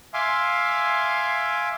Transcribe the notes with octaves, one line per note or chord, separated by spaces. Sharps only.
E5 F5 G#5 C6 D6